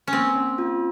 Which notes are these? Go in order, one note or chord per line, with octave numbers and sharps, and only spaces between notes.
C#4
A#3 C4
C#4
F4